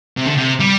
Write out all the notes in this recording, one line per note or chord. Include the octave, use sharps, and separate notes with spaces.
C3
D3
C3
G3